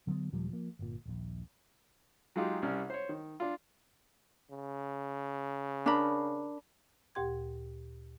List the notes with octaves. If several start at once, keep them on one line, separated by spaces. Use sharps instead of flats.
D3 F#3 A#3 B3
D#2 A#2 F3 G3
F3 A#3
G1 A#2
D#1 A#1
F#3 G#3 D#4 F4 G4 G#4
C2 G3 C#4 F6
C5 C#5
D#3
D4 F4
C#3
D4 A#4 B5
D2 A#2 G4 G5 C6 G#6